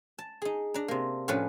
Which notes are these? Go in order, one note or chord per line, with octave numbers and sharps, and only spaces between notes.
A5
D#4 G#4
D4 A#5
C3 A#3
A2 F3 C#4 D4 B4